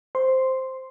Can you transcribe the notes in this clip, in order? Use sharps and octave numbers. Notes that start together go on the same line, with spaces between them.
C5 C6